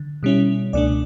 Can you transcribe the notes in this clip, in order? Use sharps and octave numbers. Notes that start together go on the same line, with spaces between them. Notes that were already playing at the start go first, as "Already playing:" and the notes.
Already playing: D3
B2 G3 C#4 E4
C#2 B2 A3 D4 D5